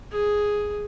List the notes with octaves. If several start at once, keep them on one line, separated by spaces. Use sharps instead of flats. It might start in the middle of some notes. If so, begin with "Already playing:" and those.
G#4